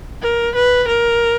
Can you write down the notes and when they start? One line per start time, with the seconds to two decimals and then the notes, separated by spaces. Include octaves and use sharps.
0.23 A#4
0.55 B4
0.88 A#4